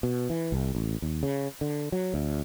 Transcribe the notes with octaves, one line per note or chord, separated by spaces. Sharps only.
B2
E3
C2
A1
D#2
C#3
D3
F#3
D2